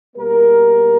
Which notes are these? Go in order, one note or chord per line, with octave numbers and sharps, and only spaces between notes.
B2 G3 A#3 A#4